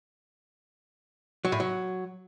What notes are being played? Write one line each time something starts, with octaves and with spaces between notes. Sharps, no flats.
F#3
A2
F#3